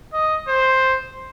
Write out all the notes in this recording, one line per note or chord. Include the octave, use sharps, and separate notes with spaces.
D#5
C5